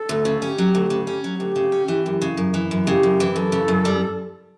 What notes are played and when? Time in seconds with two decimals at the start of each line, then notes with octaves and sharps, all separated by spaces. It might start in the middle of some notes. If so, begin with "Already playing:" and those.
Already playing: A4
0.09 D2
0.25 C#3
0.42 C#4 G4
0.58 F#3
0.75 D2
0.90 C#3
1.07 C#4
1.24 F#3
1.40 D2 G4
1.56 C#3
1.72 C#4
1.88 E3
2.06 F#2
2.22 C#3
2.37 F#2
2.54 E3
2.71 F#2
2.86 C#3 G4
3.03 F#2
3.20 E3
3.36 F#2 A4
3.52 C#3
3.68 F#2
3.85 G3